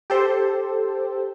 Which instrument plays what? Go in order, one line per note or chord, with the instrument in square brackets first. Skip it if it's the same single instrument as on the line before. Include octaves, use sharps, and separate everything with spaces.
[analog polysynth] G4 A4 C5